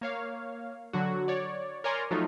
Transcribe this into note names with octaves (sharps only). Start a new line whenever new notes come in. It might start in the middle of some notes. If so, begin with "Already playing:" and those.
A#3 C#5 F5
D3 F#3 F#4
C#5 D5
A#4 C#5 D5 G#5 A#5 C6
F3 F#3 A3 D#4 F4